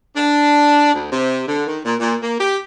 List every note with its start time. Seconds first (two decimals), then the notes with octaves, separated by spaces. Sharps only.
0.16 D4
0.93 D2
1.11 C3
1.47 D3
1.66 D#3
1.85 A#2
1.99 A#2
2.22 A#3
2.39 G4